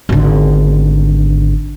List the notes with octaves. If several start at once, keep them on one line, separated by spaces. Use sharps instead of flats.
G#1 D3